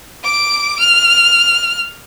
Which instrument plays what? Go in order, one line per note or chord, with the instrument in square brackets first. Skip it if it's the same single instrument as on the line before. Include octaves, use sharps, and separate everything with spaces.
[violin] D6 D7
F6